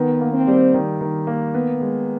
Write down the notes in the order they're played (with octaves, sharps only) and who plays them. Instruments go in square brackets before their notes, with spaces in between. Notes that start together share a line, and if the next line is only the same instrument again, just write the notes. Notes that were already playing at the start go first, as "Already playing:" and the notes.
Already playing: [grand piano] D#3 [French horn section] B3
[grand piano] A#3
[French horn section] C4
[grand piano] G3
D#3
D#3
A#3
B3
G#3